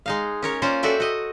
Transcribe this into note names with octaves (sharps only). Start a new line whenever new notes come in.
G#3 D#4 F5
C#4 A#4 C#5
A#3 C#4 F4 C5 D5
F#4 A4 D5 E5 G5
F#4 D#5